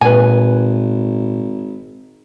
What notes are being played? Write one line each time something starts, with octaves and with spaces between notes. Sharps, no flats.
G#1 A#2 B4 G#5